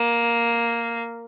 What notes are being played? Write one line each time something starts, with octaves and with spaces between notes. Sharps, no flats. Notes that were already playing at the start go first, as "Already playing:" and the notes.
Already playing: A#3